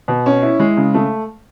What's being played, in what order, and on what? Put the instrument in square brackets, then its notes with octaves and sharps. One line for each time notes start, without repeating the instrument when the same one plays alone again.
[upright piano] B2
C#4
E4
G#3
C#3
A3